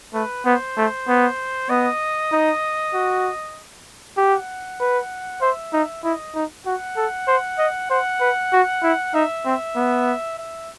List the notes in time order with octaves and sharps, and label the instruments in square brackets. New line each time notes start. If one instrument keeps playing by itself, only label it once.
[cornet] A3 [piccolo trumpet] B4
[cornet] B3 [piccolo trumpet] C5
[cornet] A3
B3
[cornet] B3 [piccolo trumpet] D#5
[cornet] D#4
F#4
[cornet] G4 [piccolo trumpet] F#5
[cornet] B4
[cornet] C5 [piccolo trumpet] E5
[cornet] D#4
[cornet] E4 [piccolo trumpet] D#5
[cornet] D#4
[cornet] F#4 [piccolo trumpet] F#5
[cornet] A4
C5
D#5
[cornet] C5 [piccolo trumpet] F#5
[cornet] B4
F#4
E4
[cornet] D#4 [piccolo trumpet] E5
[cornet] C4
B3
[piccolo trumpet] E5